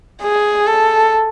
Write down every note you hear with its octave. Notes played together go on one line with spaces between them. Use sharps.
G#4
A4